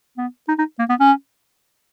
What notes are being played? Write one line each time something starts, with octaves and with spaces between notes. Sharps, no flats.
B3
D#4
D#4
A#3
B3
C#4